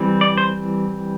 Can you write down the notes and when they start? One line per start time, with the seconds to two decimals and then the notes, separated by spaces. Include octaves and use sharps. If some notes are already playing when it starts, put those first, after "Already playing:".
Already playing: E3 G3 C4
0.21 D5
0.38 C5